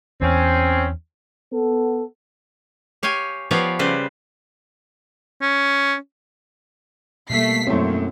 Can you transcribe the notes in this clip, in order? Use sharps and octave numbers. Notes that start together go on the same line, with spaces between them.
E2 C4 C#4
B3 A4
G4 C#5 F5 G5 G#5
F3 B3 G4 C#5 D5 F5
C#3 G3 B4 C5 D5
C#4
B2 G3 A3 A#3 B6 C7
F#2 A3 C4 E4 C5 C#5